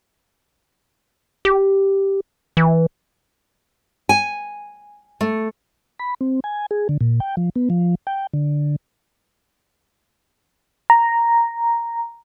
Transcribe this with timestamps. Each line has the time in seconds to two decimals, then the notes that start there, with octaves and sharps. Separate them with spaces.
1.45 G4
2.57 E3
4.09 G#5
5.21 A3
5.99 B5
6.21 C4
6.44 G#5
6.71 G#4
6.89 D3
7.01 A#2
7.20 G5
7.37 F3
7.56 B3
7.70 F3
8.07 G5
8.33 D3
10.90 A#5